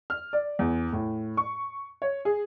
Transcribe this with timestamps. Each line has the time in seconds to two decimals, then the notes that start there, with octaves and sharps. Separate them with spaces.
0.10 F6
0.33 D5
0.59 E2
0.93 A2
1.37 C#6
2.02 C#5
2.25 G#4